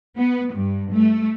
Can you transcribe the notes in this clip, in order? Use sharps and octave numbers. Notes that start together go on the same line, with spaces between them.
B3
G2
A3